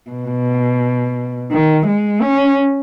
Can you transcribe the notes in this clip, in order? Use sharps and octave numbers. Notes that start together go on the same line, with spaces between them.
B2
D#3
G#3
C#4